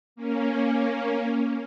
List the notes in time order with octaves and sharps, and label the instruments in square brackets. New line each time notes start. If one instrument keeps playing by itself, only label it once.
[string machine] A#3 C#4